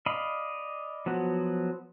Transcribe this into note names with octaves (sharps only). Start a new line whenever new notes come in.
D5 D#5 F5 B5
F3 F#3 B3 F#4